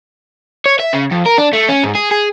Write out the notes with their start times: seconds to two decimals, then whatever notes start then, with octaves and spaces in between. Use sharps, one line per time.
0.66 C#5
0.80 E5
0.93 C#3
1.11 F2
1.26 A#4
1.38 D4
1.53 A3
1.69 C#4
1.84 G#2
1.95 G#4
2.12 G#4